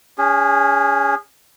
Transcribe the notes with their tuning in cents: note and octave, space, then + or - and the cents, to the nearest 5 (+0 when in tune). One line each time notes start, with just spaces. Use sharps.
C#4 +25 G#4 -25